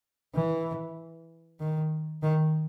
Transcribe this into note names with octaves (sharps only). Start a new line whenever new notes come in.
E3
D#3
D#3